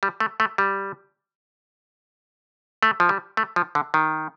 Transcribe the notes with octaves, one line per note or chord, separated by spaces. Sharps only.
G3
A3
A3
G3
A3
F3
G3
A3
F3
D3
D#3